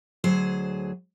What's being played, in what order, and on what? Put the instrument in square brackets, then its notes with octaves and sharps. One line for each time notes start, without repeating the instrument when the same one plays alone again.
[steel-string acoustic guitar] D2 F#3 G#4 C5